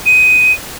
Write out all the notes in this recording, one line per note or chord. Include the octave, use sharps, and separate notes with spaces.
D#7